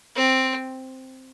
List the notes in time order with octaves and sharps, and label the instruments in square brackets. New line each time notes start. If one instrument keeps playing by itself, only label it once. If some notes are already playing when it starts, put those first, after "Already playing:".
[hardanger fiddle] C4